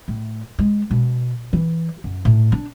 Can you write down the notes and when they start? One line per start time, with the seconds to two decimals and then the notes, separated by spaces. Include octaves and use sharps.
0.08 A2
0.59 G#3
0.91 B2
1.53 E3
2.04 F#2
2.25 A2
2.52 D4